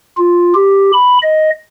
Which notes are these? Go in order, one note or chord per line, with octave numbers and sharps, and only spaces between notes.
F4
G4
B5
D#5